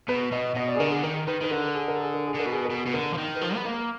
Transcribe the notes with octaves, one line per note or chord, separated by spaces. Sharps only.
B2 B4
B2 D#5
B2 D#5
D5
G#4
D3 A#4
G#4
D#3 A#4
D#3 B4
D#3 B4
D3 A#4
G#4
A#4
G#4
A#4
G#4
D3
A#4
B2
G#4
A#4
B2
G#4
B2
D3 A#4
F3
D#3
B4
F3 A#4
B3
A#3 A#4